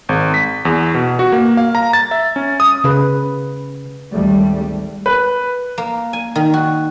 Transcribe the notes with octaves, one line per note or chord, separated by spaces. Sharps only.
G#1
B6
E2
B2
F#4
A#3
F5
A#5
A6
E5
C#4
D#6
C#3 B4
G#1 D2 G3 A3
B4
A#3
G#5
D#3
F#4